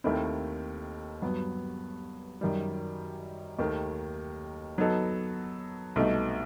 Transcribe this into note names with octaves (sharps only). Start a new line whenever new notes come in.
D#2 D#3 A3 C4 E4
G2 F#3 B3
F#2 D#3 G3
D#2 D#3 A3
F#3 B3 D#4 A4
C2 B2 A3 D#4